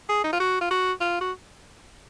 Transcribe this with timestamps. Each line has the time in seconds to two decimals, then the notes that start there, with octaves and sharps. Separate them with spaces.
0.09 G#4
0.24 D#4
0.33 F4
0.40 F#4
0.61 F4
0.71 F#4
1.01 F4
1.21 F#4